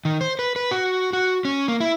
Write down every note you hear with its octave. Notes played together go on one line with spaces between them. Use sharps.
D#3
C5
B4
B4
F#4
F#4
C#4
A#3
E4